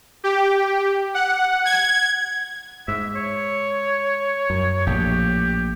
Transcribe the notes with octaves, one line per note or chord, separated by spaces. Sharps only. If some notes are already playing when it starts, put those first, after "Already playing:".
G4
F#5
G#6
G#2 E5
C#5
F#2
A#1 A2 G4